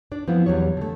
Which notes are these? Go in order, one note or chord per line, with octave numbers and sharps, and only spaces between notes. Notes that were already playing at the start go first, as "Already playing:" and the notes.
D4 D5
F3 B3 C4 E4
E2 F#3 G3 C#5
D3 A3